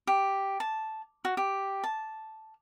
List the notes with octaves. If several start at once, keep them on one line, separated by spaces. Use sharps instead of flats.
G4
A5
F#4
G4
A5